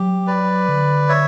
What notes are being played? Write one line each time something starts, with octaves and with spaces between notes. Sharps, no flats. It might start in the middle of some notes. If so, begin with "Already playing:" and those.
Already playing: F#3 G4
B4 D5
D3
C#5 E5